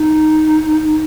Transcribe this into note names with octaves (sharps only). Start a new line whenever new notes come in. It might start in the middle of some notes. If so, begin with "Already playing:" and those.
Already playing: D#4